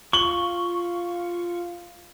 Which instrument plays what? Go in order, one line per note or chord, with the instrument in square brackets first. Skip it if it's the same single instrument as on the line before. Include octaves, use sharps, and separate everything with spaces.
[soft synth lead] F4 [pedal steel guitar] C#6 [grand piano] F#7 G7